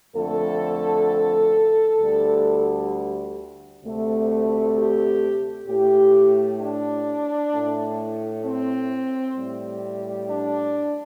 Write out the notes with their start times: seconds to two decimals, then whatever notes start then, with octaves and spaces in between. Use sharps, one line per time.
0.16 F2 D3 A3 A4
2.00 D2 D3 G3
3.84 D2 C3 A3
4.76 G4
5.68 A2 A3 G4
6.60 D4
7.52 A2 A3
8.45 C4
9.37 A2 G3
10.29 D4